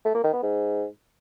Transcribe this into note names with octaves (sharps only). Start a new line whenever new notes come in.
A3
A#3
D#3
B3
G#2